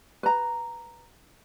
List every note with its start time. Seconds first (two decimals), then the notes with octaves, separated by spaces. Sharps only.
0.23 B4 A#5